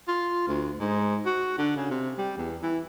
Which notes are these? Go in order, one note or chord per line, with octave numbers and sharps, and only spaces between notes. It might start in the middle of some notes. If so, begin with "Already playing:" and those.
F4
D2
G#2
F#4
D3
C#3
C3
G3
E2
E3